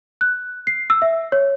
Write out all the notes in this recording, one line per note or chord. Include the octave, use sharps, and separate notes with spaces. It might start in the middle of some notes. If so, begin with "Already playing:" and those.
F#6
C7
E6
E5
C#5